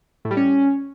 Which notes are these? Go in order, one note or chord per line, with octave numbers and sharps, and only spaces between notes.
A2
G3
C#4